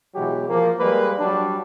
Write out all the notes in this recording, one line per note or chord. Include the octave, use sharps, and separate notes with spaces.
B2 E3 F#3 G#3 G4
F3 A#3
G3 G#3 A#3 B4
F#3 G3 D4